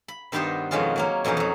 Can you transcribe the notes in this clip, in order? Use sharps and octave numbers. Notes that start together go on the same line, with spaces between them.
B5
G2 D#3 B3 D#4 G4 C5
F2 B2 D#3 G#3 C#4 F4
F#3 A#3 C#4
F2 B2 E3 C#4 D#4
F2 F#3